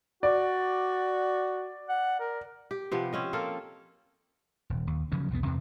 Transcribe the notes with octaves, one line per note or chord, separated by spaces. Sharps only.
F#4 D5
F#5
A#4
G4
C3 F3 B3
C4 C#4 D#5
A#3 F4 A4 A#4
D#1
D#2
C#3 F3 F#3 C#4
B1 E2 F3 B3
E2 C3 C4